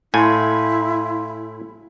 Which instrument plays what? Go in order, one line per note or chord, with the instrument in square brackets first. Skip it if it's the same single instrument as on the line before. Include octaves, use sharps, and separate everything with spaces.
[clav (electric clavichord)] A2 G#5 [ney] E4 [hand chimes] F5 C6